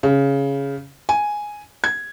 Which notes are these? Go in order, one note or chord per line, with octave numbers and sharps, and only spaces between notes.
C#3
G#5
G#6